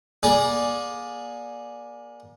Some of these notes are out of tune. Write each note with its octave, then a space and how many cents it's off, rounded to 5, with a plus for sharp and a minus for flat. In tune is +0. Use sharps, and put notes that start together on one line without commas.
A#3 +35 G#4 +0 D5 +0